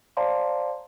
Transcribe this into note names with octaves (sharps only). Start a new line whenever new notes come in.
C5 D5 F5 A5 A#5 C6